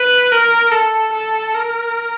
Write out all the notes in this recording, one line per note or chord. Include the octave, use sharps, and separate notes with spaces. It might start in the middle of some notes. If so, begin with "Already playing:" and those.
Already playing: B4
A#4
A4
A4
A#4